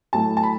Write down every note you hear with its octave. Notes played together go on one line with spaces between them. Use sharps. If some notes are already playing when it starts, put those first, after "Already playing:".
A2 F#3 A3 E4 A5
A5
B5